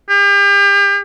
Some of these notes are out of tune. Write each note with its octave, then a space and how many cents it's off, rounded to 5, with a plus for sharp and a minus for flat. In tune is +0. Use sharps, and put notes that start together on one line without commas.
G4 +40